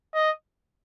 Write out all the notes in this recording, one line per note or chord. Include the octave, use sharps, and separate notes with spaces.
D#5